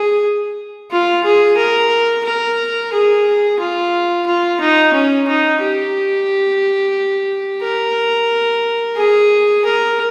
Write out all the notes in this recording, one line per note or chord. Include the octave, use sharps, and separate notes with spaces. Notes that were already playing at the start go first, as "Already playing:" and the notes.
Already playing: G#4
F4
G#4
A#4
A#4
G#4
F4
F4
D#4
C#4
D#4
G4
A#4
G#4
A#4